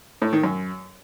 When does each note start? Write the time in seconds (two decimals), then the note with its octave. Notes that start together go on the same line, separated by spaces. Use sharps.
0.22 A2
0.33 D#3
0.44 F#2